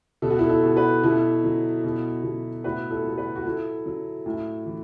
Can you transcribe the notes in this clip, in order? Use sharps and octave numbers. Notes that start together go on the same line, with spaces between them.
B2 A4
F#4
E4 A4
E4 A4
B2
F#4 B4
B2 E4 A4
F#3
B2
B2
A2 F#4 B4
E4 A4
F#3 A4
F#4 B4
F#4
F#3 E4 A4
F#3
A2
E3